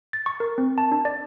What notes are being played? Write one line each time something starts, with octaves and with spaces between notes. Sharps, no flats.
A6
C#6
A#4
C4
A5
D4
D5